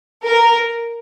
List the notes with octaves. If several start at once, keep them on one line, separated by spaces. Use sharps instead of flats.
A#4